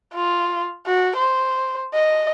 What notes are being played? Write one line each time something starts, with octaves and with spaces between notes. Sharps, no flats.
F4
F#4
C5
D#5